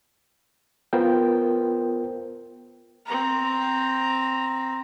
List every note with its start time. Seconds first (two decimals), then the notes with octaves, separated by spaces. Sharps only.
0.93 B3 F4 A#4 C5 G5
3.06 C4 A#5